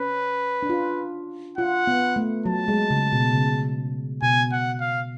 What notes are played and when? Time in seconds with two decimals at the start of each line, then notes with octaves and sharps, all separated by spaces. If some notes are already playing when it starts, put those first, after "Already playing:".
Already playing: C#4 B4
0.63 D4
0.70 F4
1.58 F4 F#5
1.87 B3
2.16 A3
2.46 F#3 A5
2.68 G#3
2.90 C#3
3.12 B2
3.34 C#3
4.22 B2 G#5
4.52 F#5
4.80 F5